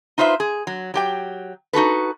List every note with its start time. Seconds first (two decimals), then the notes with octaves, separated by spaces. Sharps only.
0.18 D#4 F4 B4 C5 E5
0.40 G#4
0.67 F#3
0.94 F#3 G4 G5
1.73 D#4 F#4 A4 B4